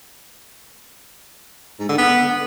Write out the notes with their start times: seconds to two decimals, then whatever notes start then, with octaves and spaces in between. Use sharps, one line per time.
1.80 G#2
1.89 D3
1.98 B3